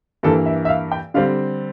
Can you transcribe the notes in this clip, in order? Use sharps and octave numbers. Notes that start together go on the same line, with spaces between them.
G2 E3 A#3 A4
E5
E5
F5
G5
D3 G3 C4 F5